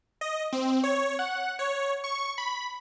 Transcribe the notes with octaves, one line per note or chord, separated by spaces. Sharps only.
D#5
C4
C#5
F#5
C#5
C#6
B5